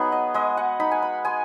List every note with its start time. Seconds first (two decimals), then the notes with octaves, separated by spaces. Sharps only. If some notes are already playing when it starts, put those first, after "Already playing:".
Already playing: F#3 B3 D#4 F#4 G#4 B4
0.12 D#5
0.34 G#3 D#5
0.57 F#5
0.80 D#4 B5
0.91 G#5
1.02 B5
1.25 G#3 G#5